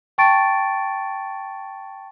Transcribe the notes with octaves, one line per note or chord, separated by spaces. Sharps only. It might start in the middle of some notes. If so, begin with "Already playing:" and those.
G5 A5 C#6 A6 D7